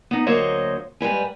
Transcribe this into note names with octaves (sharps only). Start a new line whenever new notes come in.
B3 D#4
D2 F#3 A#3 C5 C#5 D#5
G#2 G3 B4 G#5